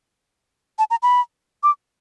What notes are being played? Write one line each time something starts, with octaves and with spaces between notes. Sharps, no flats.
A5
A#5
B5
D6